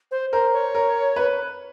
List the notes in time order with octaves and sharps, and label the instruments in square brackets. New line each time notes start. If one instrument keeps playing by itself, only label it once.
[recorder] C5
[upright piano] A#4 [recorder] C5
[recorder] C#5
[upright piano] A#4
B4